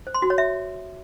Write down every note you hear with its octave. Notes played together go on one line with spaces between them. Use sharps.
C5
C6
F#4
C#5
E5